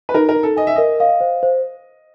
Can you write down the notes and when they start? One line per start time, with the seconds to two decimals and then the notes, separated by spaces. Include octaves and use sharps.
0.09 B4
0.14 D#4 A#4
0.29 A#4
0.36 D#4
0.43 A4
0.57 D#5 G#5
0.67 E5
0.76 A#4 D#5
1.00 D#5 F5
1.21 C5
1.43 C5